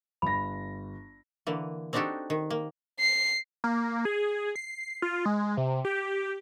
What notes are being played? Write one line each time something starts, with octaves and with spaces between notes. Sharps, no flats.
G1 B5 A#6
D3 E3 A#3
C4 D4 D#4 F#4 G4 A4
D#3
A#3
C7
A#3
G#4
C7
F4
G#3
C3
G4